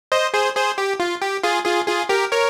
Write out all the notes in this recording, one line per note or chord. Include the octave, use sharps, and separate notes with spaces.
C5 D#5
G#4 C5
G#4 C5
G4
F4
G4
F4 G#4
F4 G#4
F4 G#4
G4 A#4
A#4 C#5